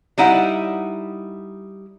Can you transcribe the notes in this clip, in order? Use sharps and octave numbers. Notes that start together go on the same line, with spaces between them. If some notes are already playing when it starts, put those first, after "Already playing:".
G3 D#4 E4 F#5